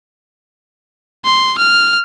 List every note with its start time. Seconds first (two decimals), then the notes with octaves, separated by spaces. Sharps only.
1.25 C6
1.58 F6